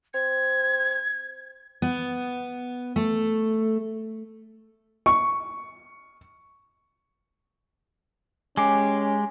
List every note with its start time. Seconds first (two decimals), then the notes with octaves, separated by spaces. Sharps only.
0.14 C4 G#6
1.82 B3
2.96 A3
5.06 C#6
8.57 G#3 C#4 G4 G#5 D6 C7